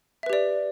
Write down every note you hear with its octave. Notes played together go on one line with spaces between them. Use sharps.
G4 B4 D5 E5